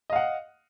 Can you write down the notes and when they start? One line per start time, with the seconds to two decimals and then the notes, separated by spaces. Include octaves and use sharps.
0.10 D#5
0.13 F5
0.16 F#5